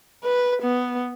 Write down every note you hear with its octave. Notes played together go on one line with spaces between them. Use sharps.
B4
B3